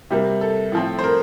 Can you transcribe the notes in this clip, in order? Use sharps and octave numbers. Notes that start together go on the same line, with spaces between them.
C3 G3 A#3
A4
A2 F3 C4
C5
A#4